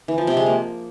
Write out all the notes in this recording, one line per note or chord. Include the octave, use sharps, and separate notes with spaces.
E3
F3
C3
G#3
A#3